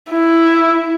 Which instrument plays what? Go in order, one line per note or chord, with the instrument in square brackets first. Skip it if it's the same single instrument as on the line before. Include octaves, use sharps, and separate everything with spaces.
[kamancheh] E4